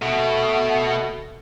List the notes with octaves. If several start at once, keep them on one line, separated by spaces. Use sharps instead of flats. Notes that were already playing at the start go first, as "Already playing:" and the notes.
B2 A3